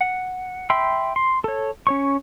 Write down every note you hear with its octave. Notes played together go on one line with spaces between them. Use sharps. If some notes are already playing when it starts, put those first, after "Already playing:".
F#5
E5 G5 B5 C6 E6
C6
A4 C#5
C#4 C#5 C#6